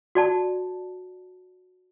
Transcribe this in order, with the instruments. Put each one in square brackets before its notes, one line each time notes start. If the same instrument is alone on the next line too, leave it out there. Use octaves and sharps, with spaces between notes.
[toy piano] F#4 D5 A5